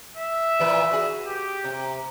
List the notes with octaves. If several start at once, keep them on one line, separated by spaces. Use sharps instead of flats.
E5
A#2 E3 B4
F#4 G#4
G4
C3